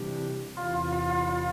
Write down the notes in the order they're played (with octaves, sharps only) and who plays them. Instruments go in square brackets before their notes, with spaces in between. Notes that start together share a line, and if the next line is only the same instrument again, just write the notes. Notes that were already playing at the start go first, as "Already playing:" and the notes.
Already playing: [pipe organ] C3 E3 G3 D4 G4
[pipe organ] E2 C3 E3 [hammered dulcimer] F4
[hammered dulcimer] F4
F4
F4
F4